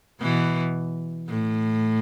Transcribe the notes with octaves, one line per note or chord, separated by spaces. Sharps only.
B2 E3
A2